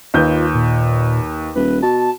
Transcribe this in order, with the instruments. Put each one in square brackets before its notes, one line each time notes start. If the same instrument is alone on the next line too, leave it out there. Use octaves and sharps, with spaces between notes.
[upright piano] D#2 B4 G6 [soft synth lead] F4
[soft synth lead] A#2
[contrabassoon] D#1 [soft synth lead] B4
[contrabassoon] B2 [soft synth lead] A5